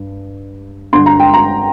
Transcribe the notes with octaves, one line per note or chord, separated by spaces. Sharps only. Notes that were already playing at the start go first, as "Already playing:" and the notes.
Already playing: G2
G2 D3 C6
A#5
G5
A#5